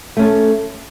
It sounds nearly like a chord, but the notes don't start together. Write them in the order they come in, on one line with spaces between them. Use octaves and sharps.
A3 C#4 A4